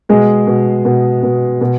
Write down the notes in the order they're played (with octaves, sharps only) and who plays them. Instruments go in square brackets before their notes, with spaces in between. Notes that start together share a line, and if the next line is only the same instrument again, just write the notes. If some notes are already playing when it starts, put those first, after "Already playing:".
[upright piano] B2 G#3 G#4
B2
B2
B2
B2